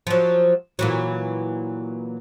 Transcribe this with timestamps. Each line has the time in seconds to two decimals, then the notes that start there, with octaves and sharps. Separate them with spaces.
0.07 F3 F#3
0.79 A#2 E3 F#3